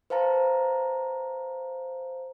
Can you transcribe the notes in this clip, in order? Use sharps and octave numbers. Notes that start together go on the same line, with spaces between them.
B4 C5 F5 A5 A#5